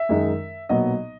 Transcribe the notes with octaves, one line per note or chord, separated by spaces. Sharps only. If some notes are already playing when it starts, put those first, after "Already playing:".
Already playing: E5
F#2 D#3 G#3 D#4
B1 A#2 F#3 B3 D#5